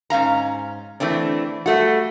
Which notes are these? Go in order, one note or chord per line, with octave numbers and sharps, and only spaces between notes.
G#2 C#4 F5 A#5
E3 A3 C4 D4
G3 A3 F#4